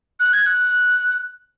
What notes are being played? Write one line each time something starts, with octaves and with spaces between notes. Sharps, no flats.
F#6
G#6
F#6